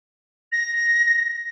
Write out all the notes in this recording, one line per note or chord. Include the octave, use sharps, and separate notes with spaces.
A#6